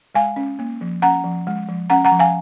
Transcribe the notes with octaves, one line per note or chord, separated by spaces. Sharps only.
G#3 F5 G#5
C#4
A#3
F3
C#4 F#5 A#5
F3
G#3
F3
C#4 F#5 A#5
F#5 A#5
F3
F5 G#5